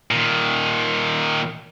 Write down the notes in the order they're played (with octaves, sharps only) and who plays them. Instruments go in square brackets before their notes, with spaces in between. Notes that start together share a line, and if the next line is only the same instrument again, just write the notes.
[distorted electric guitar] A#2 D#3